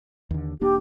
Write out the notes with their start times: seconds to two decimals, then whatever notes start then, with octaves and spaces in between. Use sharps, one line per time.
0.31 D#2 D3
0.61 E1 A#3 D4 G4